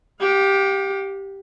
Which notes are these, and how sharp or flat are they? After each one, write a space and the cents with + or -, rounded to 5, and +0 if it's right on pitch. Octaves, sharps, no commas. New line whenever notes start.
G4 +0 F5 +45